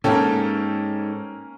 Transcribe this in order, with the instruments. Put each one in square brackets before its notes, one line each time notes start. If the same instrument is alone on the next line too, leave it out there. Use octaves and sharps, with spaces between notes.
[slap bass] G#2 [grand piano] A#3 C#4 [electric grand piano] A4 G5 A5